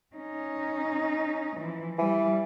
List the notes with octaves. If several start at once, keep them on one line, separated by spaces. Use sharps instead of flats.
C#4 D#4
E3 F3
E3 G3